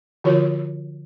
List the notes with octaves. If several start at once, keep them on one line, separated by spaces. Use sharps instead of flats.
D3 F3 F4 F#4 C#5